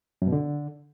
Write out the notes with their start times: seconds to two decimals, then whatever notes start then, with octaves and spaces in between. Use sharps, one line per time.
0.22 F#2
0.27 B2
0.32 D3